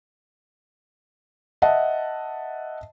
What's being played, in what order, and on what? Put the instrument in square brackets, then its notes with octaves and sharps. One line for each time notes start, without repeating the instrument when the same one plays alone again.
[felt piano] D#5 E5 F#5 A5